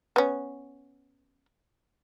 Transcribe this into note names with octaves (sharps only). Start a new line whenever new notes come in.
B3 C#4